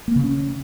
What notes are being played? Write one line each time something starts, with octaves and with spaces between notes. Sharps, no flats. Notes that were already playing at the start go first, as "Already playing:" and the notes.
A#3
C#3
C#4